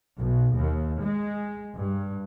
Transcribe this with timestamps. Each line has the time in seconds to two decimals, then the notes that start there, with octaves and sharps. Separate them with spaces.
0.18 B1
0.56 D#2
1.00 G#3
1.76 G2